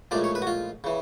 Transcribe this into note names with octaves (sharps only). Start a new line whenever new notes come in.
A#1 A2 F3 G#3 D5
C#5
B4
F#4
F4
C#3 E3